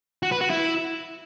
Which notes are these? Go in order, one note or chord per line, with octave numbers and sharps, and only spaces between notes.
F#4
B4
F#4
E4